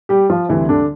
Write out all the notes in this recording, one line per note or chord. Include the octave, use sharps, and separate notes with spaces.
G3 G4
F3 F4
D2 C3 E3 G3 E4
D3 D4